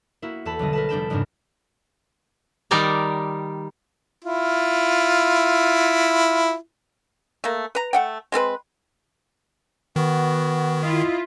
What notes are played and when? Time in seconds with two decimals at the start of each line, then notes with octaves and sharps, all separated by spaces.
0.22 A#3 E4 F#4
0.45 E2 A4 A5 B5
0.59 B1 D3 G3 D#5
0.73 A#4 B4 A5
0.89 F1 G3 D4 G5 B5 E7
1.10 F2 G#2 C#3 A#3 C4 D4
2.71 D#3 G3 D#4 A#4 D5 A#5
4.24 E4 F4
7.44 A3 A#3
7.75 B4 A#5
7.93 A3 F#5 G5
8.32 G#3 C4 A4 B4
9.96 D#3 B3 F#4
10.83 E4 F4 D#5